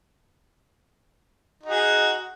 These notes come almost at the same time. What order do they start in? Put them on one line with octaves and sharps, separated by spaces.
D#4 F#4 G#4